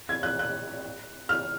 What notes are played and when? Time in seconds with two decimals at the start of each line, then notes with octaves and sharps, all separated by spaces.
0.09 G#6
0.23 F#6
0.39 F#6
1.29 F6